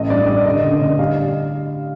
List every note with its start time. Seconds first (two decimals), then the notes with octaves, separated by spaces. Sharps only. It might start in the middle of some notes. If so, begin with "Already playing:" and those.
Already playing: A1 A3 D#5
0.10 G2 D5
0.27 G3 D#5
0.45 D3 D#5
0.64 D3
0.81 D3
0.99 G3 F5